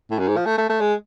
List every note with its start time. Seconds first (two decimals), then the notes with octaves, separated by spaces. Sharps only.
0.11 A2
0.19 F#2
0.28 G#2
0.37 F3
0.46 A3
0.58 A3
0.69 A3
0.81 G#3